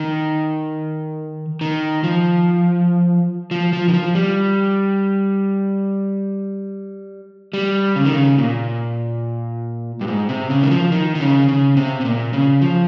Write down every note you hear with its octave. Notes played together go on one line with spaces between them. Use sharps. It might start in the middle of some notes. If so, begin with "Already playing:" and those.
Already playing: D#3
D#3
F3
F3
F3
D#3
F3
G3
G3
C#3
D#3
C#3
A#2
G2
G#2
C3
C#3
D#3
F3
D#3
D#3
C#3
C#3
C3
C3
A#2
C#3
F3